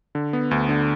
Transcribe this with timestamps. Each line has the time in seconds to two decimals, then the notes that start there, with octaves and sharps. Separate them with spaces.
0.15 D3
0.33 B3
0.51 D2
0.69 D3